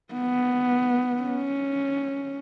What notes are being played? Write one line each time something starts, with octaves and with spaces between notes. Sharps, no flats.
B3
C#4